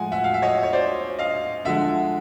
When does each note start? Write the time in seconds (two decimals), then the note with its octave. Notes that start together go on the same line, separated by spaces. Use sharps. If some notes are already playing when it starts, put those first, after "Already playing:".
Already playing: A2 F3 G#3 F#5 G#5
0.12 E5 F#5
0.24 F5
0.34 E5
0.42 C#5 D#5
0.63 C#5
0.73 C5 D5
1.19 D#5 F5
1.65 D3 F3 G#3 E5 F#5